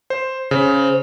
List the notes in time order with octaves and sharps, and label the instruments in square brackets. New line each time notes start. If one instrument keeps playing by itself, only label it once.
[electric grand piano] C5
[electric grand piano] C#3 [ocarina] C5